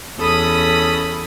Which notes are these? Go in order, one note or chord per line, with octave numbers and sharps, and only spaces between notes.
E2 C#4 A4 B5 D#6